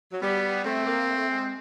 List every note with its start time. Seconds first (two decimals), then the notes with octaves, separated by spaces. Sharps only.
0.12 F#3
0.22 G3 B3
0.65 A3 C4
0.87 A#3
1.09 A3
1.30 G#3